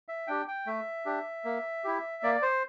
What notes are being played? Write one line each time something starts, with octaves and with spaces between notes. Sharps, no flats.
E5
D4 G4 G5
G5
A3 E5
D4 G4
A#3
E4 G4
A#3 D5
C5